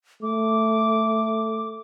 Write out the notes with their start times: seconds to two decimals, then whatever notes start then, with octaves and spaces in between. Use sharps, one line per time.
0.23 A3 D6